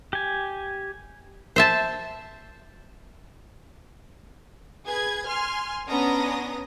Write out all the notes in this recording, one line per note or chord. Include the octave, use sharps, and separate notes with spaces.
G4 G#5
C5 E5 A5
G#4 B4 G#6
G#5 C6 F6
B3 C#4 D4 A#5 D#6 A#6